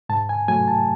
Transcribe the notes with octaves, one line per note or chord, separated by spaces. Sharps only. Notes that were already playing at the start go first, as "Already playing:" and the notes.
G#2 A5
G#5
F#3 A3 G#5
A5